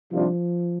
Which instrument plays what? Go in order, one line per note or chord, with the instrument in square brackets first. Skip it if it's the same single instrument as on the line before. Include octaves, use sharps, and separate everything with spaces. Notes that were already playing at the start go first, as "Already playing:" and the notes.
[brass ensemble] C3 D#3 G3 D4 F4 [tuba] F3